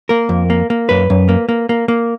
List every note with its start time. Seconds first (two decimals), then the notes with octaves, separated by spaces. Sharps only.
0.09 A#3 A#4
0.29 F2
0.50 A#3
0.70 A#3
0.89 F#2 B4
1.10 F#2
1.29 A#3
1.49 A#3
1.69 A#3
1.88 A#3